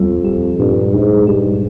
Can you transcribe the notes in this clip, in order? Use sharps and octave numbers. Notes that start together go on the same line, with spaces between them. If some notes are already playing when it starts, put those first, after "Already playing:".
Already playing: F2 G3
G4
G2 A#2
G#2 G3
G2 G4